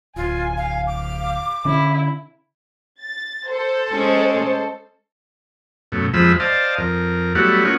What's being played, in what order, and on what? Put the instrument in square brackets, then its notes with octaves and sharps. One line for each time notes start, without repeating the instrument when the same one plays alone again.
[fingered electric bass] D1 [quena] F4 [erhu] G#5
[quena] F5
[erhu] F5 [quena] D6
[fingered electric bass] D3 C#4 D4 [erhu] E4
[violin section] A6
A4 C5
[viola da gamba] G#3 C#4
[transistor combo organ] F#2 B2 A3
F2 F3 G#3 B5 E6
C5 D5 D#5 F5 A5
F2 A#4
F#3 G3 A3 B3 E4 F#4
A#3 C#4 D#4 F4 F#5